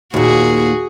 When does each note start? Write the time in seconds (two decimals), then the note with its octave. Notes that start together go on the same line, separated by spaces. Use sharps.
0.14 D#2 A#2 F#4 G#4